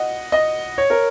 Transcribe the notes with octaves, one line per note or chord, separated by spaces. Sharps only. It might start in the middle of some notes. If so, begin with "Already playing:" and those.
Already playing: D#5 F#5
D#5
C#5
A#4